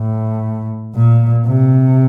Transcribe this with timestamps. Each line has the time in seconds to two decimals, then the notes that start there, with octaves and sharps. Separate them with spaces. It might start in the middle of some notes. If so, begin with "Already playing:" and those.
Already playing: A2
0.95 A#2
1.47 C3